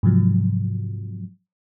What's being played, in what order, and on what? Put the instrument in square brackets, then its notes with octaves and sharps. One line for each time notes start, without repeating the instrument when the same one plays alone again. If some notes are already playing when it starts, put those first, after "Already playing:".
[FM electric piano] G#2 C3 F3 F#3